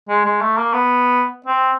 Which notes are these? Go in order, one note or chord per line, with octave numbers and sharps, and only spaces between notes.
G#3
G#3
A3
A#3
B3
C4